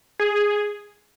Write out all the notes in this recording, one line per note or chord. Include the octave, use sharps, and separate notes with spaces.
G#4